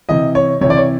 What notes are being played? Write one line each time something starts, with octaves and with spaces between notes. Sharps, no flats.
C3 E3 D#5
C#5
C3 E3 C#5
D5
C#5